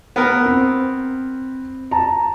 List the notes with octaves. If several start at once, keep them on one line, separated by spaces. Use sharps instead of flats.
B3 A#4
C4
A5 A#5